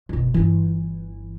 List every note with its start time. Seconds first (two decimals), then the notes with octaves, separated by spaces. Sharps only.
0.09 F#1 B2
0.34 G1 E3 D4